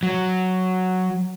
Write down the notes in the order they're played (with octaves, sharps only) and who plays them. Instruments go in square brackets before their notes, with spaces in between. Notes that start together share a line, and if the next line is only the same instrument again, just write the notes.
[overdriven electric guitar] F#3